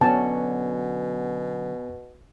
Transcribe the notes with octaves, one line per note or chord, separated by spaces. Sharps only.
B2 D3 F#3 B3 C#4 F#5 G#5 A5